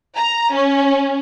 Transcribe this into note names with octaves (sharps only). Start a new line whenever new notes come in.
A#5
C#4